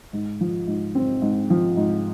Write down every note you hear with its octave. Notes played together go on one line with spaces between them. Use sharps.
G#2
F3
G#2
C4
G#2
F3
G#2